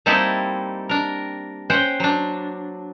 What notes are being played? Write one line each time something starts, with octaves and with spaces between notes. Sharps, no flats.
G3 A#3 C4 D#4 E4 A4
D4 A#4
C#4 C5 F#5 G5
F#3 D4